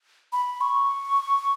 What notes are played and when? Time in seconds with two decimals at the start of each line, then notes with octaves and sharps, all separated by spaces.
0.33 B5
0.61 C#6